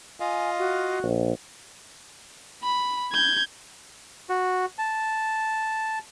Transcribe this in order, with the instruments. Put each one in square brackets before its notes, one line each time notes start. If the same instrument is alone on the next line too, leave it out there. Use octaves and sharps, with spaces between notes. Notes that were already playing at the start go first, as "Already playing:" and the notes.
[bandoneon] F4 D#5 F5 [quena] G#5
[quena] F#4
[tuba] A#1
[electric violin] B5
G6 G#6
[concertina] F#4
A5